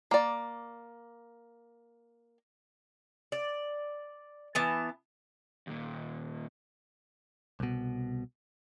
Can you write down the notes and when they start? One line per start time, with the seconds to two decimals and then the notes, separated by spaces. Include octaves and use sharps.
0.11 A#3 D5
3.32 D5
4.55 E3 B3 A5
5.67 D#2 A#2
7.60 C2 B2